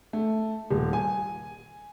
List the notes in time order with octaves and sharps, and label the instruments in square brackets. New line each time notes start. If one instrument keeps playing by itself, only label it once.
[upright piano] A3
D#1
G#5